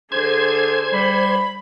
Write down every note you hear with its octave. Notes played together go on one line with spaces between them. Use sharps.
D3 G#4 C5 G#6
G3 B5